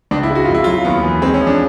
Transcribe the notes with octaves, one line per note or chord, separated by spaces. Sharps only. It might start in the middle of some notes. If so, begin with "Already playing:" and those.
C#2 D4
E4
G#3
F#4
F2 F4
E4
F#3 F4
D#2 B3
E3
G#3 C4
C#4
F3
D4